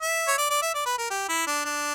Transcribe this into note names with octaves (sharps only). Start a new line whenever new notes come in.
E5
C#5
D5
D5
E5
D5
B4
A#4
G4
E4
D4
D4